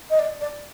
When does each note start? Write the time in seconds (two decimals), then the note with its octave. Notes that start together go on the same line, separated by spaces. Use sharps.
0.10 D#5
0.19 D5
0.41 D5